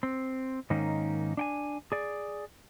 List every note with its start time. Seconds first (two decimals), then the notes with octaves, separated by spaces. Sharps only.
0.03 C4
0.70 G#2 D#3 A#3 C#4 D#4
1.37 D4 G5 G#5
1.92 G#4 D5